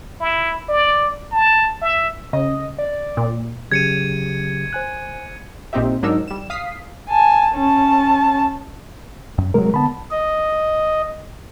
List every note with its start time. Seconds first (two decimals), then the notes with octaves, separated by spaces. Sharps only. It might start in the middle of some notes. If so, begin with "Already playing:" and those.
0.20 E4
0.69 D5
1.32 A5
1.82 E5
2.33 C#3 D#5
2.78 D5
3.17 A#2
3.72 C#3 F#3 G4 G#6 C#7 D#7
4.73 C5 G#5 F#6
5.73 A#1 A#2 C4 D#4 G4 E5
6.02 G#2 F#3 D4 D#4 A#4 E6
6.28 G3 E7
6.50 F5 D#6 B6 C7
7.09 G#5 A5
7.55 C#4 A5
9.38 F#2
9.54 C3 F#3 G#3 A#4
9.74 D3 B3 A5 B5
10.11 D#5